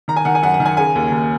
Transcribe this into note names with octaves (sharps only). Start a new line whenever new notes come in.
D#3 A#5
G#5
D#3 F#5
G#5
F#2 F#5
F#5
D#3
G#5
C#3 G#5
D#2
D#2